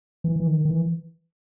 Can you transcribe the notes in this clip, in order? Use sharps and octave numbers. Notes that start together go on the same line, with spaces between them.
E3
E3
D#3
D#3
E3